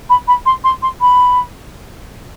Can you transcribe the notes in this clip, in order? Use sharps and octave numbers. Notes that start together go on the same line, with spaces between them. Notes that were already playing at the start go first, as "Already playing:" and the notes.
B5
B5
C6
C6
C6
B5